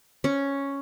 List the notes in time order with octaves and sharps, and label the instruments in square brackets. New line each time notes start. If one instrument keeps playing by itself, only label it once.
[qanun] C#4